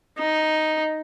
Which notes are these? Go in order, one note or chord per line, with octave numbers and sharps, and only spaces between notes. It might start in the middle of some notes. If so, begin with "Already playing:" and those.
D#4